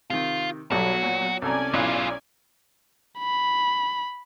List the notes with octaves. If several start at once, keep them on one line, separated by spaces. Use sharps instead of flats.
C3 D#3 F4
B1 F#3 G3 B3 F#4 A4
A#2
C2 C#4 A4 D5 G#5 A#5
B1 F#3 E4 F4 F#6
B5